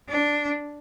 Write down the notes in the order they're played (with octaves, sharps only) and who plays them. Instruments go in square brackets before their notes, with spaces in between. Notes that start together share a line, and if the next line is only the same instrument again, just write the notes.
[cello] D4